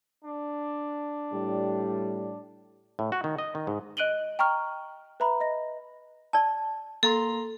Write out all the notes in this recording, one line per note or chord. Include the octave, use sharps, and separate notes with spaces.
D4
A2 G3
A2
F#4
D#3
D#5
D#3
G#2
D#5 F#6 D7 D#7 F#7 G7
G5 A#5 C#6 F6
B4 E5 A#5 B5
D#5 A#6
D5 A5
A#3 A4 A#5 C6